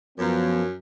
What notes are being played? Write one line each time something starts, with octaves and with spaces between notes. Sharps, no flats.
F#2 F3 B3